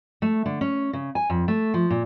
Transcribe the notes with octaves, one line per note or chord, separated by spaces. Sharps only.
A3
D3
C#4
C#3
G#5
F2
A3
F3
A#2